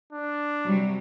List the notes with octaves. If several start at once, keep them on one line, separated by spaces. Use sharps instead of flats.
D4
C3 F#3 G3